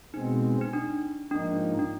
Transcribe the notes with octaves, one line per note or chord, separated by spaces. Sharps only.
B2 G#3 C4 D#4
D#4
D4
G#2 F3 A#3 D4 D#4
D4